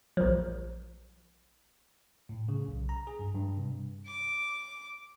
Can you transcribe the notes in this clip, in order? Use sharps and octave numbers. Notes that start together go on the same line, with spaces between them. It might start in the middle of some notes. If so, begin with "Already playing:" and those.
A#1 F3
A2
C#3
B1
A#5
G#4
G2
G2
C3
D6